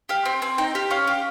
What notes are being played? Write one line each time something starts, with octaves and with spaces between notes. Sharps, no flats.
G4 F5
C4 G5
C4 G#5
D#4 G5
G4 F5
C#4 F5
G4